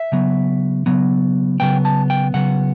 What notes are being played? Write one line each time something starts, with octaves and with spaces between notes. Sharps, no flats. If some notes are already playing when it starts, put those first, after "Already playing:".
Already playing: E5
C#3 F#3 B3
C#3 F#3 B3
C#3 F#3 B3 G5
A5
G5
C#3 F#3 B3 F#5